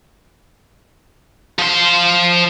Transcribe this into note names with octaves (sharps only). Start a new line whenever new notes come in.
F3 C6